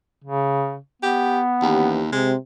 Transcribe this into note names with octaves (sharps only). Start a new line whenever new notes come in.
C#3
B3 G4
D#2 E3 C#4 G4
C3 G#3